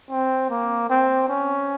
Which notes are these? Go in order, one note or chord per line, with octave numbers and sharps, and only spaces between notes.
C4
A#3
C4
C#4